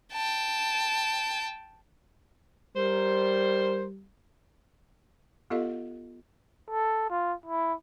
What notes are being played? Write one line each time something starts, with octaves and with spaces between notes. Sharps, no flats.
G5 A5
G3 A#4 C5
B3 F4 G4 A4 D#5 F5
A4
F4
E4